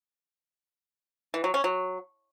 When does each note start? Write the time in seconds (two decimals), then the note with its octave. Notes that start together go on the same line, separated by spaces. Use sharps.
1.34 E3
1.44 F#3
1.54 C#4
1.64 F#3